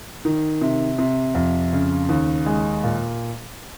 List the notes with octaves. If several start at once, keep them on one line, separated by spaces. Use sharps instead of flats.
D#3
C3
C3
F2
C#3
D#2
G#3
A#2